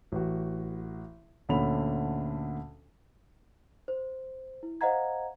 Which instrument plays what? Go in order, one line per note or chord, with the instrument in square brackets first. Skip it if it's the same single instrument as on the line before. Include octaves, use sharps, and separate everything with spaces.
[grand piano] A1 F#4
D2 A#2 D3 C#4 B5 F7
[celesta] C5
E4
C5 D#5 F5 F#5 A#5 G#6